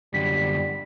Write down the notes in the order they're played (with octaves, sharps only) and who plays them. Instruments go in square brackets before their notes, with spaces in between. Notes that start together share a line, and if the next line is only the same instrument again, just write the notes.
[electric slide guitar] F#2 D3 [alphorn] G3 [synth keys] B6